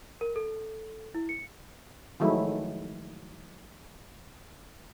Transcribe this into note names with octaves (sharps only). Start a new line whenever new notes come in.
A#4
A4
E4
C#7
D#3 F3 F#3 G#3 A3 E4